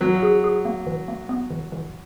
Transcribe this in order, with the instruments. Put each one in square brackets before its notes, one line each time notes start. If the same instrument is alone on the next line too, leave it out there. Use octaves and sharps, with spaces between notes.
[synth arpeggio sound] E3 [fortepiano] F#3
[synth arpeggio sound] G#4
G#4
A#3
E3
A#3
B3
E3
E3